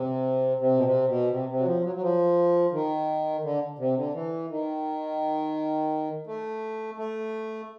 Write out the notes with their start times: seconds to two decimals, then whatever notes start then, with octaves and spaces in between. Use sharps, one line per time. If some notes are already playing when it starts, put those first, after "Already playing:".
Already playing: C3
0.60 C3
0.77 B2
0.84 C3
1.08 B2
1.31 C3
1.49 C3
1.59 F#3
1.66 F3
1.84 F#3
1.95 F#3
2.02 F3
2.73 D#3
3.44 D3
3.79 C3
3.97 D3
4.14 E3
4.49 D#3
6.27 A3
6.98 A3